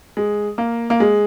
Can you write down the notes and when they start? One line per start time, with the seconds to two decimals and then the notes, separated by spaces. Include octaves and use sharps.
0.17 G#3
0.58 A#3
0.90 A#3
1.00 G#3